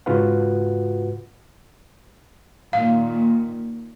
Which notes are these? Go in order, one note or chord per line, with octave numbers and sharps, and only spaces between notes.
G#2 C#3 F4 F#4 B4 F#5
A#2 D#3 F5